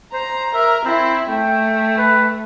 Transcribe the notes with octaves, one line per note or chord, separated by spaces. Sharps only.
C5 A#5
A#4 E5
C4 E4
A3 G5
B4